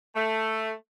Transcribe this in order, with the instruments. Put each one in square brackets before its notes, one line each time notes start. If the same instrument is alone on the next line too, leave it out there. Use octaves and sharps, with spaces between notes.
[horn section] A3